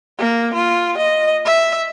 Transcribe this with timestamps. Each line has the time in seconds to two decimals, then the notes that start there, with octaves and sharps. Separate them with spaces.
0.18 A#3
0.54 F4
0.98 D#5
1.45 E5